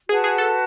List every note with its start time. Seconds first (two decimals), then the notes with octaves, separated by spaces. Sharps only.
0.09 F#4 G#4 B4 F#5 A5
0.24 G#4
0.38 A4